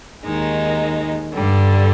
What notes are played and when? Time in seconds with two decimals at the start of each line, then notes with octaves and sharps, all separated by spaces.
0.25 D#2 D#3 G#3 D#4
1.33 G2 D3 G3